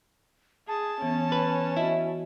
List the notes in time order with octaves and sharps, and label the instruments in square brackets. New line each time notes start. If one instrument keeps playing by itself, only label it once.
[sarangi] G#4 [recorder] A5
[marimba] E3 B3 [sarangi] C#4
[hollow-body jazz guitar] B4
[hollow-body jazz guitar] E4 [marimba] F#4 D#5 E5